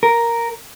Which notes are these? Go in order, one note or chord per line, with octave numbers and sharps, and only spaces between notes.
A#4